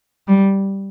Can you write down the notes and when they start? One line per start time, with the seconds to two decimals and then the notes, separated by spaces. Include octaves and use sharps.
0.28 G3